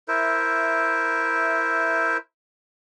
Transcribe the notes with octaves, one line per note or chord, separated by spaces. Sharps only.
E4 A#4 C5 E5